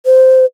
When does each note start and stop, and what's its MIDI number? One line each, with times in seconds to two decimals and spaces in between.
0.06 0.45 72